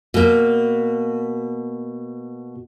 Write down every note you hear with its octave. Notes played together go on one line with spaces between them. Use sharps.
B2 A#3